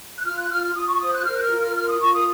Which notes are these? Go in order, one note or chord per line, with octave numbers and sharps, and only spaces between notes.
F#6
F4 F6
F#6
F4 F6
F6
F4 D#6
C#6
C5 D#6
F#6
A#4 F6
F#6
F6
F4
F6
A#4 F6
D#6
F4 C#6
D#6